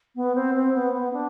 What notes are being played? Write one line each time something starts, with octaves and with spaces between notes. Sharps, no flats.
B3
C4
C4
B3
B3
D4